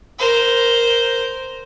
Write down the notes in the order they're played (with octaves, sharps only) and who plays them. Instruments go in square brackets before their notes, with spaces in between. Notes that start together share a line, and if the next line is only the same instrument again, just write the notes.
[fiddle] A#4 C5